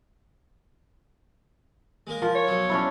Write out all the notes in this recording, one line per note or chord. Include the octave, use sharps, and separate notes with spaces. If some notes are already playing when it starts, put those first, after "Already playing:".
G#3 A#3 A#4
F3 A#4
C#5
B1 F#3
C#4 D4 E4